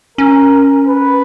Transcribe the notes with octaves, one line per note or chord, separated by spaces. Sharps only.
C#4 A#4
B4